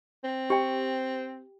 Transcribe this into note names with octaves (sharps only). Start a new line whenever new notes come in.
C4
G4 G5